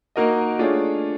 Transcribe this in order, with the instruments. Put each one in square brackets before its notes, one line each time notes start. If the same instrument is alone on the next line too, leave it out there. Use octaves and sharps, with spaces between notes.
[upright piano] A#3 D#4 F#4 A#4 D#5
A3 D4 F4 G#4 C#5